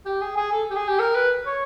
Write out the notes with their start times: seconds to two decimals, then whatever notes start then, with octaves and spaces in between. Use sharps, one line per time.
0.06 G4
0.21 G#4
0.37 G#4
0.52 A4
0.70 G4
0.76 G#4
0.88 G4
0.99 A#4
1.15 B4
1.47 C#5